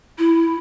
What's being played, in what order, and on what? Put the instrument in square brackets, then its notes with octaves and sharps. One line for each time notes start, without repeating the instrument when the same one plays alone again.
[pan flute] E4